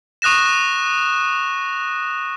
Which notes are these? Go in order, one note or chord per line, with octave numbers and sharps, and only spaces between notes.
C#6 D#6 F#6 A#6 E7